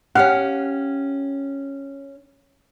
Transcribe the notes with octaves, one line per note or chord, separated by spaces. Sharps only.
C#4 G4 F5 F#5